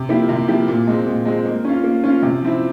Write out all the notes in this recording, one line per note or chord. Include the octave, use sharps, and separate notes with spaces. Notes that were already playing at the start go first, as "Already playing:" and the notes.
Already playing: C3
F3 A#3 E4 G4
C3
F3 A#3 E4 G4
A#2
G#3 C4
A#2
G#3 C4
A#3
C#4 F4
A#3
C#4 F4
C3
F3 C4 E4